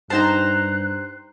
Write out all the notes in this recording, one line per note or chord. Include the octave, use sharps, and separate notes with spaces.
G2 D#4 C5 G5 A5 A#5 F#6